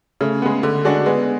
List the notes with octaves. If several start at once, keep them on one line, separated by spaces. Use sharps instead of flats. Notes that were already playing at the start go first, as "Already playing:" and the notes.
C#3 A3
G#3 B3
D3
G#3 D4 F#4
G#3 B3